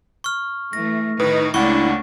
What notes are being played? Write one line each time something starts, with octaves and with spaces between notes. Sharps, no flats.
C#6 F6
E3 A3 A#6
A2 D#3 D#4 B4
C#2 A3 C#4 D4 E4 F#5 C#6